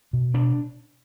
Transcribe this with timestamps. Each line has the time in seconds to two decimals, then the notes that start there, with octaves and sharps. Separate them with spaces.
0.13 B2
0.34 B2 D4